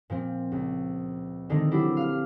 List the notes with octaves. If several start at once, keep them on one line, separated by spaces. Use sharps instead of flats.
A#2 F3 C4
C#2
D3 D#3 G#3 A3 C4 D#4
F#3 D4 E4 G4
F5 F6